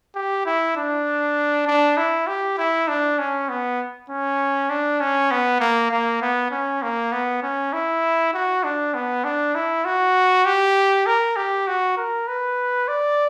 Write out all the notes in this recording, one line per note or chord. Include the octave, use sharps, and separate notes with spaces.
G4
E4
D4
D4
E4
G4
E4
D4
C#4
B3
C#4
D4
C#4
B3
A#3
A#3
B3
C#4
A#3
B3
C#4
E4
F#4
D4
B3
D4
E4
F#4
G4
A#4
G4
F#4
A#4
B4
D5